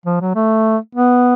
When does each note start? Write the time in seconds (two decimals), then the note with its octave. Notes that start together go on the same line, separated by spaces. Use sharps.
0.06 F3
0.21 F#3
0.35 A3
0.95 B3